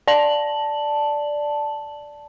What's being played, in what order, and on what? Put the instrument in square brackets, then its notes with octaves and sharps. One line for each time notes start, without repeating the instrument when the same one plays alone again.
[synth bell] D5 A5 F#7